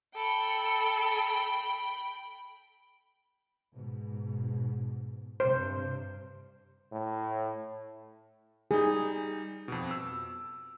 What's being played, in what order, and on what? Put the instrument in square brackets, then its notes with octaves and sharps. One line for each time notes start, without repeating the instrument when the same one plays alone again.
[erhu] A4 [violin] G5 B5
[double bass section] G#2 B2
[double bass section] G2 C3 [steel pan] C5
[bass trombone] A2
[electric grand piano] G3 D#4 [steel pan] G#4
[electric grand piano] F2 B2
E6